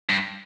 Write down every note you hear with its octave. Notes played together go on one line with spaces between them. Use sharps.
G2